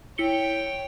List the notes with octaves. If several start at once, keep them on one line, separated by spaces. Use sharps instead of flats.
E4 C#5 G5 C#7 G7